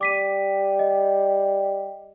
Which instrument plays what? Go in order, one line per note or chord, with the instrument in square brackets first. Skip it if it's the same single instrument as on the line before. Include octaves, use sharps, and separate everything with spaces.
[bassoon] G3 [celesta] D6 B6 D#7
[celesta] D#5